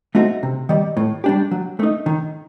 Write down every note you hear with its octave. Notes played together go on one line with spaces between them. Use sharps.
A3 C4 D#4 F#4
C3
D#3 G3
A2
G3 D4 G4
F#3
A3 D#4
D#3